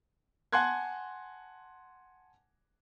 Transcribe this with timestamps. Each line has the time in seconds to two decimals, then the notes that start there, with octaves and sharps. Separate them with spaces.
0.52 F#5 G#5 A5 C6 F#6 G#6